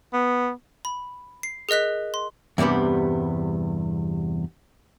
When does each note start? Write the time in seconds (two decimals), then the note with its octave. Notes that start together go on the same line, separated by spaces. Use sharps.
0.13 B3
0.85 B5
1.43 C7
1.69 G#4 A#4 D#5 F#6 B6
2.14 C6
2.58 E2 G2 C3 G3 B3